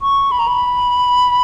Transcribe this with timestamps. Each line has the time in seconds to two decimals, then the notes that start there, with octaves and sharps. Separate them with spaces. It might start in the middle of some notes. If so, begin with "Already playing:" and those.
0.02 C#6
0.32 B5
0.39 A#5
0.48 B5